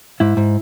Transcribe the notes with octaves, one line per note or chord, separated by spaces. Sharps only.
G#2 E4
G#2